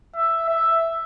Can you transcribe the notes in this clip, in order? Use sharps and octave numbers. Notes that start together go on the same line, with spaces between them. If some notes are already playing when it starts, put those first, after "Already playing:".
E5
E5